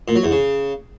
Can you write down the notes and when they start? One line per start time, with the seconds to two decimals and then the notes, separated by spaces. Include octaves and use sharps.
0.08 A#2
0.16 F#3
0.24 E2
0.31 C#3